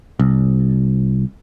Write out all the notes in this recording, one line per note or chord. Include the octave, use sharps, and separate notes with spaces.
C2